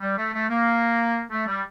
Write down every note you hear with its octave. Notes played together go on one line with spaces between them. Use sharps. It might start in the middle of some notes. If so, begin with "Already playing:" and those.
G3
A3
A3
A#3
A3
G3